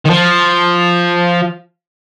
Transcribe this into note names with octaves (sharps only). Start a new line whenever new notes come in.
D#3
F3